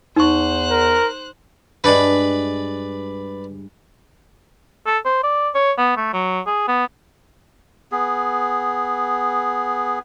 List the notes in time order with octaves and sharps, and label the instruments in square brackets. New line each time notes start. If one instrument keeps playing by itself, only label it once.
[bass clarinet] E2 [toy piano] D#4 C#6 [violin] C5 F#6
[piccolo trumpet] A#4
[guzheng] G2 G#3 [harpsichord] B4 D5 B5
[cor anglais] A4
C5
D5
C#5
B3
A3
F#3
G#4
B3
[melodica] B3 G#4